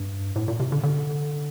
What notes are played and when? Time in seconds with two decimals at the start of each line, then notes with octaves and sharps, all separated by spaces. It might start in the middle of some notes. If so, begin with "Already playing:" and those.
Already playing: G2
0.36 A2
0.48 A#2
0.60 C3
0.72 D3
0.83 D3